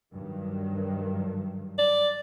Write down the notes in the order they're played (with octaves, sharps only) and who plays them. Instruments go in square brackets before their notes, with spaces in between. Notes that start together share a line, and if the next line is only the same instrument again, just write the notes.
[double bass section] G2 D#3 F#3
[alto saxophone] D5